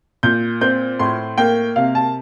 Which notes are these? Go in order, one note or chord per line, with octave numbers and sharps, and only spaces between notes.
A#2 G6
C4 G6
A2 C6
A#3 G5
C3 F5
A5